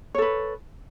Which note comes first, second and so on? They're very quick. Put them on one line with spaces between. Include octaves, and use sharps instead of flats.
C#5 A4 B4